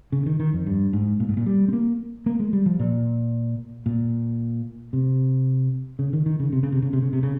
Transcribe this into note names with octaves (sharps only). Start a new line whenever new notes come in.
C#3
D#3
D#3
F2
G2
G#2
A#2
G#2
A#2
G3
C4
A#3
A#3
G#3
G3
F3
A#2
A#2
C3
C#3
D#3
D#3
C#3
C3
C#3
C3
C#3
C3
C#3
C3
C#3